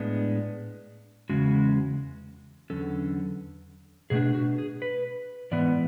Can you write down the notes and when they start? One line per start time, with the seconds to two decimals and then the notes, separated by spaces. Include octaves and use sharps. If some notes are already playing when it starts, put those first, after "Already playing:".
Already playing: A2 G#3 B3 D4
1.29 E2 C#3 G#3 C#4 F#4
2.70 E2 D3 F#3 C#4 A4
4.10 B2 A3 D4 G#4
4.34 F#4
4.58 G#4
4.82 B4
5.51 G#2 E3 B3 D5